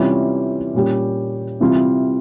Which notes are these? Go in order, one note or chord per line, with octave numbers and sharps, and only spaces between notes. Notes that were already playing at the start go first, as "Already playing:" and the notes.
Already playing: C3 E3 G3 C#4 F4
A#2 G3 C#4 G4
C3 E3 G3 C4 F4